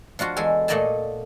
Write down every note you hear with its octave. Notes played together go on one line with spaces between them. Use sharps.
F3 D4 F4 F#4
E2 G#3 A4 G#5
A#2 A3 D5 D#5 G#5 A5